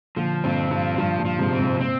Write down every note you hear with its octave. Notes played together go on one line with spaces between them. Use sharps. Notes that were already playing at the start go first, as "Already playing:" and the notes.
A#2 D3 F3
G2 A#2 C4
G2 F3
G2 F3
G2 A#2
F3
G#2 C3
C4
G#2 C3
A#2 C4